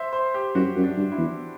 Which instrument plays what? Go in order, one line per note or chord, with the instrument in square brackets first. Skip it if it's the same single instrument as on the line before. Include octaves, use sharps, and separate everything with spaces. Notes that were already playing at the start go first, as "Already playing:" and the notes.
Already playing: [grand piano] C5 E5
C5
G4
[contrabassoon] F#2 [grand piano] F#4
[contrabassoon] F#2
[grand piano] D4
[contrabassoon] G2
[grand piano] E4
[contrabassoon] E2